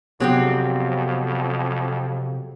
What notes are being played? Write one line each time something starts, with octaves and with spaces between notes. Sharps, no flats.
F2 C3 F#3 B3 C4 G4 G#4